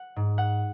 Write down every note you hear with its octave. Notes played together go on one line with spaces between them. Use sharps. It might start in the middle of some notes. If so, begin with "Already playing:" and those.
Already playing: F#5
G#2
F#5